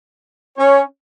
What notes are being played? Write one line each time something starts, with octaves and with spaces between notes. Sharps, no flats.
C#4 C#5